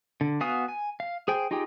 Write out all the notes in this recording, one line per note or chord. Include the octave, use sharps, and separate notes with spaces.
D3
B3 F#4 F5 G#5 D#6
G#5
F5
G#4 C5 G5 G#5
D#4 F4 G4 G#4 G5